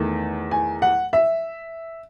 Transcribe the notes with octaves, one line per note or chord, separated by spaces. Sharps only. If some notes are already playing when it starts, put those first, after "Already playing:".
Already playing: E2 D#3 A3
G#5
F#5
E5